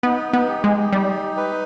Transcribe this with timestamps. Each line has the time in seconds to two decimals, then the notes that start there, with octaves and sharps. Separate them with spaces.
0.03 B3 D#4
0.33 B3
0.49 G4
0.64 G#3
0.93 G3 D#4
1.37 B4